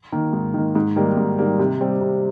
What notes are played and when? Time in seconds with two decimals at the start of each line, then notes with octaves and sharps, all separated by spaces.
0.12 D#3 A#3
0.33 G#2
0.54 D#3 A#3
0.75 G#2
0.96 D#3 G3 A#3
1.17 G#2
1.39 D#3 G3 A#3
1.59 C3
1.81 G3 C4
2.01 C3